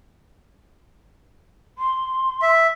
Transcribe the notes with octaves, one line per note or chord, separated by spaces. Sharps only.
C6
E5